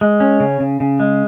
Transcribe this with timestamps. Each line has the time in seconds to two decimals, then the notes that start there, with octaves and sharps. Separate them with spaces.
0.01 G#3
0.20 C#4
0.40 C#3
0.60 C#3
0.80 C#3
1.00 G#3